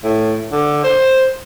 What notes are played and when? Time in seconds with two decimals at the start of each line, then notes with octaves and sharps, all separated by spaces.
0.04 A2
0.52 D3
0.84 C5